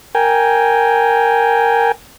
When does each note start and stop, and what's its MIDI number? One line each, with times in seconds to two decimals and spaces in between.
0.15 1.92 70
0.15 1.92 79
0.15 1.92 80